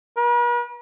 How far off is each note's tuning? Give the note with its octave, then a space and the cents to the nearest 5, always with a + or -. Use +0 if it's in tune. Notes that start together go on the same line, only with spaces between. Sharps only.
B4 -45